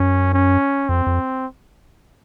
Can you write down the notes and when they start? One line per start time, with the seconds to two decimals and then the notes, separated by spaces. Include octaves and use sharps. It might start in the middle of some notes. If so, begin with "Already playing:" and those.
Already playing: F#2 C#4
0.33 C#4
0.89 F2 C4
1.06 F2